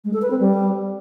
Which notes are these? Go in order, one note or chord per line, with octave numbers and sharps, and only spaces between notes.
G#3
A4
B4
C4
G3